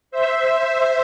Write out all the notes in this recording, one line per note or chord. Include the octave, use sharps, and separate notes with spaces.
C5 E5